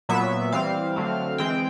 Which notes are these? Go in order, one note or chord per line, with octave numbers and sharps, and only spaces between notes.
A#2 F#3 B3 E5
E3 G3 C4 F5
D3 F#3 A3 C4
E3 G#3 C4 G5